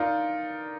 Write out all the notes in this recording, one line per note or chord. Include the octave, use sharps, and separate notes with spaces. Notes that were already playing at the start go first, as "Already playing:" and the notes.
Already playing: D#4 F4 A#4 D5